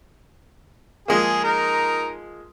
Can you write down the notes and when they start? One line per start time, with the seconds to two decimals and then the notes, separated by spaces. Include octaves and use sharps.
1.08 F3 G#3 A#3 G#4
1.44 D#4 A#4